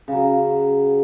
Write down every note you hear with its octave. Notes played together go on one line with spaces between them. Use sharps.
C#3 F#3